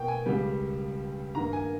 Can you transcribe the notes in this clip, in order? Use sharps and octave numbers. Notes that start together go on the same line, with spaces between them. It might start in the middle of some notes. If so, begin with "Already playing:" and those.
Already playing: B2 A#3 G5
G#5
C#2 C#3 G3
G2 D#3 A#3 A#5
G#5